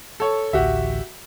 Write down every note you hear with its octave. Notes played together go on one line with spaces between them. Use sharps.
A4 C#5
A1 D2 F#4 G4 E5